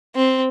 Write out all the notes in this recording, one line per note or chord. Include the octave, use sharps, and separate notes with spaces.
C4